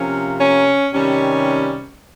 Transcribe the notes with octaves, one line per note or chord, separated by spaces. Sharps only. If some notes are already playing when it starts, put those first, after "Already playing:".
Already playing: C3 F3 A#3 C#4
C#4
C3 D#3 G3 C#4